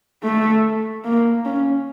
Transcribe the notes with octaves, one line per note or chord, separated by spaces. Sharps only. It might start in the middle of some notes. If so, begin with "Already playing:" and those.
A3
A#3
C#4